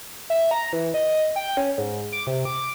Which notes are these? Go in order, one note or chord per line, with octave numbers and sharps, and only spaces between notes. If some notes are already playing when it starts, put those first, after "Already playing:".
E5
A#5
E3
D#5
G5
C#4
G#2
D6
C3
D6